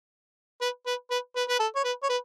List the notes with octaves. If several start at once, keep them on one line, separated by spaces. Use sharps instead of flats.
B4
B4
B4
B4
B4
A4
C#5
B4
C#5
B4